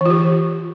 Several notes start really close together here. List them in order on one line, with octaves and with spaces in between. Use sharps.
E3 F4 G4